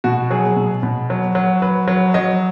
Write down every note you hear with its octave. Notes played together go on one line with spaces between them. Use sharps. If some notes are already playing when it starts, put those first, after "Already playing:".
B2 F#4
F#3 G#4
B2
B2
F#3
F#3
F#3 B4
F#3
F#3 D#5